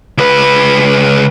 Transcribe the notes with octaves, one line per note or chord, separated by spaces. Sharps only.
C#2 B4